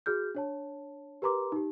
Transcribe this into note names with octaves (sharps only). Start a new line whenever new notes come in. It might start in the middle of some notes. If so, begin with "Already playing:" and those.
F#4 G#4 F6 G6
D4 C#5 A5
G4 A#4 B4 A#5 C6 D6
D#4 G4